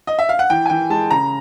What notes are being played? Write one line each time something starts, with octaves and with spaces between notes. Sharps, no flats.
D#5
E5
F5
F#5
E3 G5
G#5
E3 G5
G#3 A5
C#3 A#5